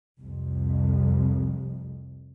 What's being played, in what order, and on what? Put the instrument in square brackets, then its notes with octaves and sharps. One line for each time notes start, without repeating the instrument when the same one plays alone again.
[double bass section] C2 F2